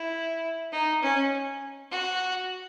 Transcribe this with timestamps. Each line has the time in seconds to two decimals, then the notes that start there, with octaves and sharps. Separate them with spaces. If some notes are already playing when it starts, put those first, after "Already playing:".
Already playing: E4
0.72 D#4
1.03 C#4
1.91 F#4